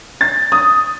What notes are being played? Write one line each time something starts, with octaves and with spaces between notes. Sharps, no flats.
A6
D#6